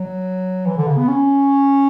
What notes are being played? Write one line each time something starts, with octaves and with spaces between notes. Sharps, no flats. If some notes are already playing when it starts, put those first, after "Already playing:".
Already playing: F#3
E3
D3
C#3
B3
C#4